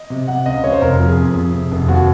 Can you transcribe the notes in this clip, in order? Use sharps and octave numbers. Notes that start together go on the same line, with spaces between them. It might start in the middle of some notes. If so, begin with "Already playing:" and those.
Already playing: D#5
C3
C3 F#5
C#2 D#5
C#2 C#5
C5
F1 A#4
F3
G#4
F2
F2
C3
F1
D#2 F#4